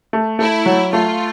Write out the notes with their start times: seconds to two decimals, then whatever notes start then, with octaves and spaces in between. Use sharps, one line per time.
0.13 A3
0.39 A3 E4
0.66 F#3
0.92 A3 F4